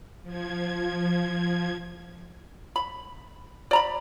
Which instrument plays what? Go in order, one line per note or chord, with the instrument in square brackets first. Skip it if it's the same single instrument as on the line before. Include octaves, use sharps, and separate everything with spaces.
[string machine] F3 G#6
[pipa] B5
D5 A#5 B5